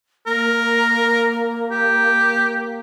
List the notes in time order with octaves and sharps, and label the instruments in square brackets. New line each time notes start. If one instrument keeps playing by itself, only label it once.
[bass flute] A#3 [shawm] A#4
[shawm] G4